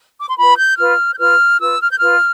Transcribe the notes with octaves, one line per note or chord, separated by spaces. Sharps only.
D6
C6
F4 B4 B5
G6
F4 B4 F6
G6
F4 B4 F6
F4 B4 E6
F6
G6
F4 B4 F6